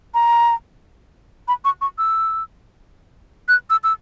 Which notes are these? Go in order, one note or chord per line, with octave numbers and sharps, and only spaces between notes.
A#5
B5
C#6
C#6
E6
F#6
E6
E6